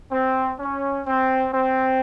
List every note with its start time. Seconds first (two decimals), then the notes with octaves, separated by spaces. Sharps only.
0.12 C4
0.59 C#4
1.06 C4
1.53 C4